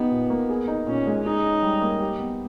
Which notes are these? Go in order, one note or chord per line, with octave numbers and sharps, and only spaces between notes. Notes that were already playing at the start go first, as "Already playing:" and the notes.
Already playing: B3 D#4 G4
A#2
A#3
G#4
D#4
A#2 C#4
G#3
D#4 G#4
C#4
G3
A#3
G4
B3